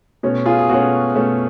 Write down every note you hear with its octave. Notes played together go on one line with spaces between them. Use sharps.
B2 A3 C#4
F4 G#4
G#4
B2 A3 C#4 F#4
B2 A3 C#4